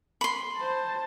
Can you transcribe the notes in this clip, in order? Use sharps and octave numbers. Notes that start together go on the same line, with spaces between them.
B5 C6
C5 A5